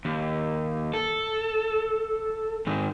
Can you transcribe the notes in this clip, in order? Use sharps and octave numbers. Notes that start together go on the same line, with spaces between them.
D#2
A4
G#2 D#3